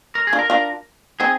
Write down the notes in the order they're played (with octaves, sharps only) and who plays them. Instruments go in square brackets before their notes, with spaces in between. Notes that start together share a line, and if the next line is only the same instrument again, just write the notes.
[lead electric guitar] A#4
G#4
[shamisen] D4 F4
[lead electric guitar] A#4
[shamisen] D4 F4
[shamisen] C4 D#4 [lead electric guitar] G#4